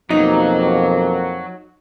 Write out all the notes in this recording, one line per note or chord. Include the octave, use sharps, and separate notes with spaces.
F2 B2 D#3 F#3 A#3 D#4